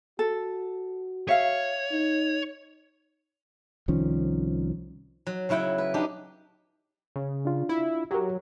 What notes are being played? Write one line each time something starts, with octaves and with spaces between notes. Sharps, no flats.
F#4 A4
C#5 E5 F5
D#4
C2 D#3 F3 C#4
F#3
C#3 F#3 E4 F#5 G5
B4
D4 D#4 G4
C#3
D4 F4
E4
F#3 G4 A#4